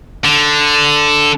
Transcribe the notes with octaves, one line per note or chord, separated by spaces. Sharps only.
D3